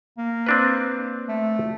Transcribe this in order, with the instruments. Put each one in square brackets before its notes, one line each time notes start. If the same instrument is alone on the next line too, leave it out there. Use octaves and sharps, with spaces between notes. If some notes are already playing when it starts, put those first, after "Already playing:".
[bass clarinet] A#3
[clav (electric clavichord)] C4 D4 B4
[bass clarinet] A3